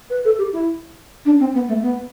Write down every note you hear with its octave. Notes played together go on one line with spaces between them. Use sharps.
B4
A4
G4
E4
D4
C4
B3
A3
B3